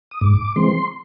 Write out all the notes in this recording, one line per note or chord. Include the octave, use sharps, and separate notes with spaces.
D#6
G#2 D6
E3 G#3 C4 C6